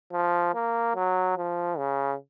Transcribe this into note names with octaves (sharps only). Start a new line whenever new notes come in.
F3
A#3
F#3
F3
C#3